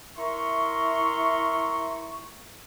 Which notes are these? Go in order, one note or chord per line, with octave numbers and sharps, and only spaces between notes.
E4 A#4 E5 A#5 C6 C#6